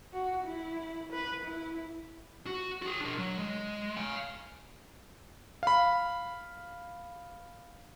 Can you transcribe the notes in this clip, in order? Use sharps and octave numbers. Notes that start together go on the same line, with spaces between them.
F#4
E4
B4
E4
F#4
F#4 G#4
D4 A#4
F#3
G#3
F5 G#5
F5 B5